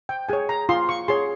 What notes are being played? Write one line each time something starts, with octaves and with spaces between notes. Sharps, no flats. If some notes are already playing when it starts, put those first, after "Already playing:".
G5
G#4 C#5 G#5
A#5
F4 C6
C#6
G#4 C#5 C6